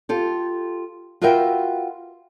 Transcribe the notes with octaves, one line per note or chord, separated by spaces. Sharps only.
F4 G4 A4
F4 F#4 A#4 B4 E5 G5